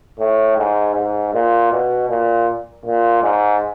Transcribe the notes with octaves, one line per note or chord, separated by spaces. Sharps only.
A2
G#2
G#2
A#2
B2
A#2
A#2
G#2